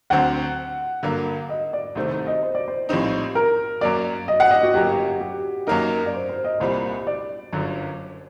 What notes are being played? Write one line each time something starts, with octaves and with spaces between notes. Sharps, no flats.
D2 D3 F#3 C4 F#5
G2 D3 F#3 A#3
D#5
D5
C2 C3 D#3 A3 C5
C5
D#5
C5
D5
C5
A#1 A2 G3 C4 D#4
A#4
F#2 F#3 A#3 D5
D#5
F#5
D#5
F#4
G1 F#2 F#3 A#3 G4
G4
F#2 F#3 A#3 D#4 A#4
D5
C5
C5
D#5
C2 A#2 G3 C5
D5
G1 F#2 D3 F#3